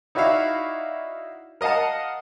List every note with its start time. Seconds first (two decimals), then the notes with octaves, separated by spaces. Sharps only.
0.15 D#4 E4 F#4 D5 E5 F5
1.61 A#4 D#5 F5 F#5 A5